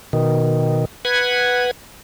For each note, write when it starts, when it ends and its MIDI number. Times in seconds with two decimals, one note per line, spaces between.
0.13 0.85 47
0.13 0.85 51
1.05 1.71 71
1.05 1.71 78
1.05 1.71 92